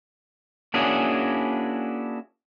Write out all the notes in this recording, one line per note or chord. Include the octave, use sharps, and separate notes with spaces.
A#3 C#4 D4 E4 F#4 G#4